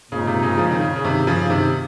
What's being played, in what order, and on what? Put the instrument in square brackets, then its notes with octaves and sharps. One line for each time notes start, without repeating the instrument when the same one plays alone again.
[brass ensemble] A#2 G#3 C4 D#4 [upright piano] C#3
[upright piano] C3
C#3
C#3 F3
D#3
C#3
C#3
C3 D#3
C#3 F3
C3 D#3